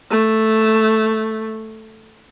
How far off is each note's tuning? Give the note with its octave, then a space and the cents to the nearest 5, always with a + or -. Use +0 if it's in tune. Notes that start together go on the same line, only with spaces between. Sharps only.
A3 +0